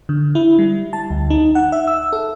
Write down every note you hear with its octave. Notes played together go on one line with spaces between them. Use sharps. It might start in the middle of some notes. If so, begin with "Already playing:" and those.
D3
E4
G3
A5
D2
D#4
F#5
E5
E6
A4